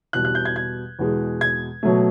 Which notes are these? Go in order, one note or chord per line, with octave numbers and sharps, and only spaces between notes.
E2 B2 G3 F#6
F#6
G6
G#6
G#6
E2 B2 G#3
G#6
B2 F#3 A3